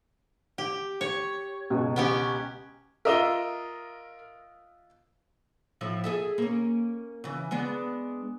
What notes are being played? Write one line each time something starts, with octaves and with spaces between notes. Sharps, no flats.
G4
C#5
C#2 B2
B3 C#4 G4
F4 A#4 D#5 E5 E6 G7
A2 F3 E4
G#4 A4 E5
A#3 C#4
C#3 E3
G#3 B3 D4